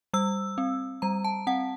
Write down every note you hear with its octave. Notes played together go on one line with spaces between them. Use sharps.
G3 E6
C4
G3 A#5
A5
C4 F#5